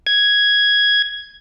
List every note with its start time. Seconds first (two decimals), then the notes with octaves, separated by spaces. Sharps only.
0.07 G#6